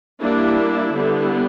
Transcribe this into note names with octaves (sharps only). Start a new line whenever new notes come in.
G3 A#3 D4 E4
D3 G3 B3